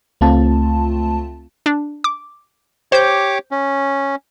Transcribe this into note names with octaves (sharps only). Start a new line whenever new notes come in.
C#2 A3 C4 F4 A5
D4
D6
G4 C5 C#5 D6 G6
C#4